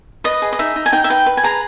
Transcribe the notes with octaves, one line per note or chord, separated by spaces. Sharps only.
B4 D#5
G#4
D#5
D#4 E5
D#4
G#5
D#4 G5
E5
B4 G5
B4
G#5
G#4 A#5